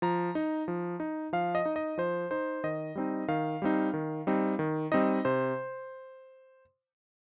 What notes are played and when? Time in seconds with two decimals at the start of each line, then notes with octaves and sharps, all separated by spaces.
0.02 F3 A#5
0.35 D#4
0.68 F3
1.00 D#4
1.33 F3 F5
1.55 D#5
1.66 D#4
1.76 D#5
1.98 F3 C5
2.31 D#4 C5
2.64 D#3 D#5
2.95 G3 C4 D#4
3.28 D#3 F5
3.62 G3 C4 D#4
3.94 D#3
4.27 G3 C4 D#4
4.59 D#3
4.92 G3 C4 D#4 D#5
5.25 C3 C5